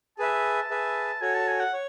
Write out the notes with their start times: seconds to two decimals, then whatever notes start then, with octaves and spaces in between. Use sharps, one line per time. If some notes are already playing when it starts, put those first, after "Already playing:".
0.18 G#4 B4 E5 A5
0.70 G#4 B4 E5
1.21 F#4 A4 C#5 G#5
1.35 A5
1.48 G#5
1.60 F#5
1.73 C#5